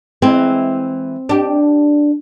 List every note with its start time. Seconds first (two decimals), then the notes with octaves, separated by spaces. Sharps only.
0.22 E3 G#3 C4 E4
1.29 D4 G4